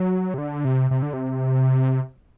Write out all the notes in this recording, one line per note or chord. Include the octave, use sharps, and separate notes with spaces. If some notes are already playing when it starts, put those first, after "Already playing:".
Already playing: F#3
C3
D3
C3
C3
D3
C3